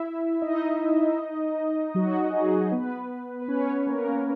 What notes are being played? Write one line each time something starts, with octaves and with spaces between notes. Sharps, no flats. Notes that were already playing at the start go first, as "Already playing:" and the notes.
Already playing: E4 E5
D#4 D#5
F#3 F#4
G#4
F#3 F#4
B3 B4
B4
C#4 C#5
A#3 A#4